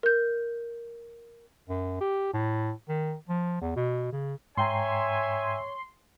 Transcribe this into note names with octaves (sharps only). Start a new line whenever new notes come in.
A#4 G6
F#2
G4
A2
D#3
F3
E2
B2
C#3
G#2 C#5 E5 G5 G#5 A#5 C6